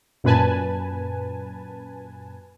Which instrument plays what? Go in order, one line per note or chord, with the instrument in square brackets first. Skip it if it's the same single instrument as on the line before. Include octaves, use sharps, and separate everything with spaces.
[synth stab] F#2 A#2 B4 G#5 A5